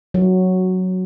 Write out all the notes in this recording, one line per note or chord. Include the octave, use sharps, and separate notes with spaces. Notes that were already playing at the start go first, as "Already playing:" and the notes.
F#3